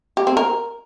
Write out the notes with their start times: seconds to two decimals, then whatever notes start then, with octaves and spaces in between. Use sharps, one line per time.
0.17 G4
0.27 C4
0.37 A#4